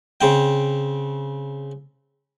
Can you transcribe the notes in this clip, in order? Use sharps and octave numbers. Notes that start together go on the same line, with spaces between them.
C#3 C4 G5